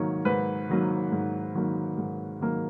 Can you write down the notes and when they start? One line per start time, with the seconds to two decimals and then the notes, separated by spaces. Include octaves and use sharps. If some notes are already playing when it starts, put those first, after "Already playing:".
Already playing: G#2 D#3 F#3 A#3 C#5
0.25 G#2 B4
0.69 D#3 F#3 A#3
1.12 G#2
1.55 D#3 F#3 A#3
1.98 G#2
2.40 D#3 F#3 A#3